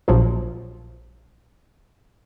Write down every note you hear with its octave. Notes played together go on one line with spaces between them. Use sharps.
A#1 F3 F#3